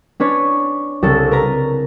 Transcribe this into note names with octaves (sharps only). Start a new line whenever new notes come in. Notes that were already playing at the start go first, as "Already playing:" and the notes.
C#4 D4 B4 C#5
C2 C#3 A4 A6
A#4 B4 A#5